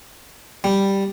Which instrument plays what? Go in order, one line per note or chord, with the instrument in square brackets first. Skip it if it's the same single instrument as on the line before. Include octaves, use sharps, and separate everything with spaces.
[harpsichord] G3